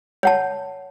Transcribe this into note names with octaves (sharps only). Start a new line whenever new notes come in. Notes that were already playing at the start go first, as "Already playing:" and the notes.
C#5 F#5 A5